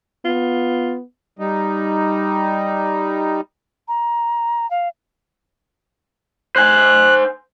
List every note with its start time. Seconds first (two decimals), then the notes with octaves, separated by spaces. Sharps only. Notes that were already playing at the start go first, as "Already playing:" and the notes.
0.25 B3 F4
1.39 G3 D#4
3.88 A#5
4.71 F5
6.56 C5 G#5 F#6